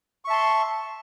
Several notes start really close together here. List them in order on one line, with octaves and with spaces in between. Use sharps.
C#6 E5 A5 C6